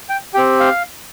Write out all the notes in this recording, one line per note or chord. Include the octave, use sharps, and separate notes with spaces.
G5
C4 G4 G5
F5